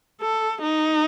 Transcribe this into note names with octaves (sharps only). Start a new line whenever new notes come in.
A4
D#4